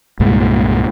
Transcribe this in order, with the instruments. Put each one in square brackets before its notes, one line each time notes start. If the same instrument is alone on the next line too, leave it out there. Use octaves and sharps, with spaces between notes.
[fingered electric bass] C2 G2 A#2 G#3